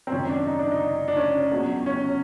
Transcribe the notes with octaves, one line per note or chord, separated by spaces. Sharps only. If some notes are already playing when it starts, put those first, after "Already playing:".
C4
G#1 F#2 D#3 C#4
D4
D#4
D4
D#4
D4
C#4
E2 B2 F#3
C#4